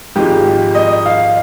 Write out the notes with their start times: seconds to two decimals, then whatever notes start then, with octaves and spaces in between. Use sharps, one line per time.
0.15 G#1 G#2 F3 G#3 G4
0.75 D#5
1.06 F5